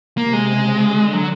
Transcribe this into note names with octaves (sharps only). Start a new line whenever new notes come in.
C3 A#3
G#3
C#3
D3
F#3